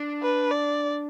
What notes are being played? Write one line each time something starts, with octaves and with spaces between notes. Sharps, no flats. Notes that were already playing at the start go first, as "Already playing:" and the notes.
Already playing: D4
B4
D5